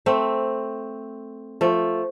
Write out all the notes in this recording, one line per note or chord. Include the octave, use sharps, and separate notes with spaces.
A3 C4
F3 A3